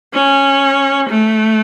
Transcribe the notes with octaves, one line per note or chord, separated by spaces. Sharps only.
C#4
A3